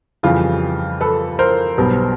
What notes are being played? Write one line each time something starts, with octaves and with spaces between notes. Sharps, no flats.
F2 C#3 E3 G3 F4 G4
A4 B4
A#4 C5
B1 B2 G3 B3